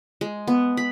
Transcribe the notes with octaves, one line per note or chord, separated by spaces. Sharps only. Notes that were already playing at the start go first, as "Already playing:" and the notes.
G#3
B3
B5